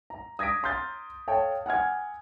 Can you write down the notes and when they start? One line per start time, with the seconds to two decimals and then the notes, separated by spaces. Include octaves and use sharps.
0.10 A#5
0.39 D#6 G#6 A#6 B6 D7
0.63 A#5 C6 F6 G6 A6
1.27 A4 C#5 F5 G5 A5
1.66 F#5 G#5 F6 G#6